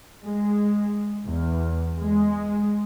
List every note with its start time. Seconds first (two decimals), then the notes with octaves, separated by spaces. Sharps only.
0.23 G#3
1.25 E2
1.99 G#3